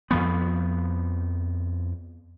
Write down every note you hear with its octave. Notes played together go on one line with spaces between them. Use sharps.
F2 F3 B3